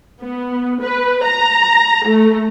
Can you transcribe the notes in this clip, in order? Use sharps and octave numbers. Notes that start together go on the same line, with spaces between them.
B3
B4
A#5
A3